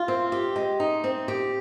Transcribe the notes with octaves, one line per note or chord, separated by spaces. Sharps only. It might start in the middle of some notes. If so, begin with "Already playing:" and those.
Already playing: F4
C4
G4
G#3
D#4
C4
G4